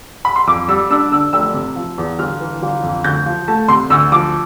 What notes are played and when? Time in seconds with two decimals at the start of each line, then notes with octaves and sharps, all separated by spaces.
0.25 B5
0.36 C6
0.47 F2 D6
0.68 G3 E6
0.90 D4 E6
1.11 D3 E6
1.33 F1 E6
1.54 C3
1.76 F3
1.98 E2
2.19 G1 F6
2.41 E3
2.62 G1
2.83 F2
3.04 D2 G6
3.26 F3
3.48 A3 A5
3.68 C3 C6
3.90 D2 E6
4.12 F3 D6